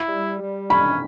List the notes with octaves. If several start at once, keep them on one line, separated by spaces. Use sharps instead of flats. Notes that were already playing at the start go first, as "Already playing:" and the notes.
Already playing: E4
G3
G3
C#4 B5